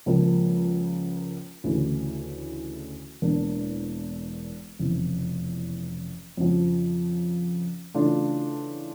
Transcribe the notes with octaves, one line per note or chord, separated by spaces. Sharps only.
C#2 C#3 F3 A#3
D2 C#3 E3 A3
E1 E2 E3 A#3 D4
F1 E2 C#3 E3
F2 C#3 F3
C#3 E3 A3 D4 F4